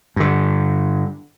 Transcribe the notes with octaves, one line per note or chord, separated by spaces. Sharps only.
G2 D3